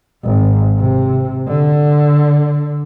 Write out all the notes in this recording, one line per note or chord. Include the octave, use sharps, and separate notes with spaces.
G#1
C3
D3